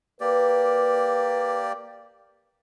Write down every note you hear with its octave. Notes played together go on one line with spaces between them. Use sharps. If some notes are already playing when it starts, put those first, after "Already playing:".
A#3 G4 B4 D5